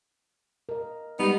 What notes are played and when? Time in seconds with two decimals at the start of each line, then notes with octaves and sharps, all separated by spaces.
0.69 A#4 D#5
1.19 G3 G#3 B3 D#4 G4